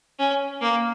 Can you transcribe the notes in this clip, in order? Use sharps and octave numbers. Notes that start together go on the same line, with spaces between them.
C#4
A#3